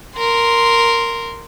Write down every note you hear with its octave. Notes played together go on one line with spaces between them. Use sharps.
A#4 C6